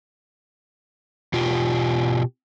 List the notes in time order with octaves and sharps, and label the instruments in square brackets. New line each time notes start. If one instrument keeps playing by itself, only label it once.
[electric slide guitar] B2 F4 G4